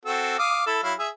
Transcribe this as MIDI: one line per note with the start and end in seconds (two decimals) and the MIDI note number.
0.05 0.36 60
0.05 0.36 66
0.05 0.36 69
0.39 0.62 77
0.39 0.62 86
0.39 0.62 87
0.66 0.81 64
0.66 0.81 69
0.83 0.94 54
0.83 0.94 64
0.83 0.94 77
0.99 1.09 68
0.99 1.09 76